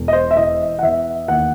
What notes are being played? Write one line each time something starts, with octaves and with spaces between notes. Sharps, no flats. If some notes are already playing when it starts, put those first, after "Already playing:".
Already playing: E1
D#5
C5
E5
E3 D#5
F#5
E2 E5
D#2 F#5